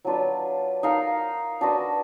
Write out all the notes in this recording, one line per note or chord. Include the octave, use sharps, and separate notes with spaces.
F#3 D4 F4 B4
D#4 A#4 F5
D4 F#4 B4 D#5